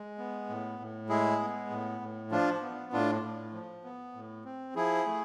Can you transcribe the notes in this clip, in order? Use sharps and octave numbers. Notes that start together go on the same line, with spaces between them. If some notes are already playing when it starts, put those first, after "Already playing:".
Already playing: G#3
B3
A2
A2
G#3 E4 G#4
B3
A2
A2
F3 D4 F4
B3
A2 D4 F4
A2
F3
B3
A2
C4
F3 E4 G#4
A3